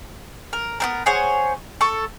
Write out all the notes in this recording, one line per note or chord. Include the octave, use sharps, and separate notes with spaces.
A#4
B3 C4 A#4
G#4 C5 C#5 F#5
A4 C#6